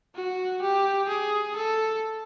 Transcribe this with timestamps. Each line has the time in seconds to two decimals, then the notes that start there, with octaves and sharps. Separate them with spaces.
0.15 F#4
0.62 G4
1.09 G#4
1.56 A4